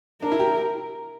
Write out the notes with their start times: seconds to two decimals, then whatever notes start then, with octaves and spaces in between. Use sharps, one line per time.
0.22 D4 A#4
0.32 E4
0.40 G4